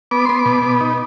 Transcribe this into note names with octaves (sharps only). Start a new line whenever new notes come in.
B3 D6
B3 C6
D6
B2
B3
D#4